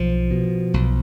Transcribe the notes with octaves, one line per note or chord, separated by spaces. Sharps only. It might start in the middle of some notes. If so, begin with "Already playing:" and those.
Already playing: B1 F3
B2
B1